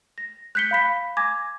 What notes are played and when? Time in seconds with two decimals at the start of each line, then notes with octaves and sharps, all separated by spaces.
0.18 A#6
0.55 F#6 G6 B6 C#7 G7
0.71 F5 B5 B6
1.17 G#5 D6 G#6 A#6